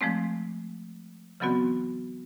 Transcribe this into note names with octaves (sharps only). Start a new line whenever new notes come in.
F3 G#3 A3 C4
C#3 E3 F#3 B3 C4 F#4